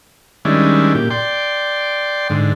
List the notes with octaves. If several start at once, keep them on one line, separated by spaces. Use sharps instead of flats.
D#3 G3 G#3 C#4 D4 E4
A#2 G4
D5 G5 C6
G#2 D3